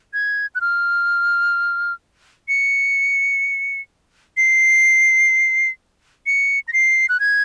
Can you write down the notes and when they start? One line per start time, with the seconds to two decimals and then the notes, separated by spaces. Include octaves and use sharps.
0.13 G#6
0.55 F#6
0.61 F6
2.48 C#7
4.37 C7
6.26 C#7
6.68 A#6
6.73 C7
7.09 F#6
7.20 G#6